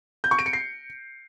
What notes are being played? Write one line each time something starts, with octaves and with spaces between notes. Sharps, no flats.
G6
C#6
D7
C#7
C7